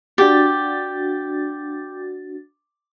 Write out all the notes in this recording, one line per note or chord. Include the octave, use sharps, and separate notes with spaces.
D4 F#4 G4 A6